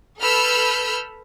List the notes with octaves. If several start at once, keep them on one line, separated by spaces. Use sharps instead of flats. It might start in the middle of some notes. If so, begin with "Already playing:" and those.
A4 B4 B5 E6 F6 G6